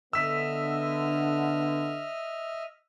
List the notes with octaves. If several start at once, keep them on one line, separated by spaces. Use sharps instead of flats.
D3 B3 D#5 E5 E6 F6 B6